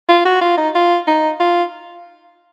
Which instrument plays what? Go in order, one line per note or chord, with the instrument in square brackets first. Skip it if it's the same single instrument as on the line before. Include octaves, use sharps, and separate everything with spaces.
[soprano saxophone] F4
F#4
F4
D#4
F4
D#4
F4